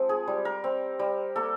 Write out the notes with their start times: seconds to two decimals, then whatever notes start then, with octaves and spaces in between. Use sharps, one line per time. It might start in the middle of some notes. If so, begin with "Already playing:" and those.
Already playing: F3 G#3 C4
0.09 G#4
0.27 G3
0.45 A#4
0.64 C4
0.99 G3
1.36 A#3 A4